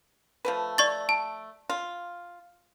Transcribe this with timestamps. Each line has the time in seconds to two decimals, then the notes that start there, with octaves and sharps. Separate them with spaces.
0.45 F3 A3 B4
0.78 D5 C#6 A6
1.09 A5
1.69 F4